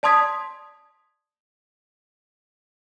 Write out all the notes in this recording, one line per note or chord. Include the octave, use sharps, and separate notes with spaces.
D5 A5 C6 D#6 G#6 B6